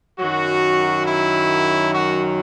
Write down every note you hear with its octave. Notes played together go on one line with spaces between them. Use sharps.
F#2 D#3 F#3 F#4
E4
F#4